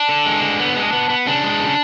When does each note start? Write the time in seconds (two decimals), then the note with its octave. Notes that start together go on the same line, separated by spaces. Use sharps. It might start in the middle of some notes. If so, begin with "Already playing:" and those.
Already playing: D4
0.09 D3
0.26 G#3
0.42 D3
0.59 B3
0.76 G#3
0.93 B3
1.10 B3
1.27 C#3 D4
1.44 G#3
1.60 C#3